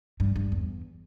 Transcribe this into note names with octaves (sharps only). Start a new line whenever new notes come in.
G2
G2
E2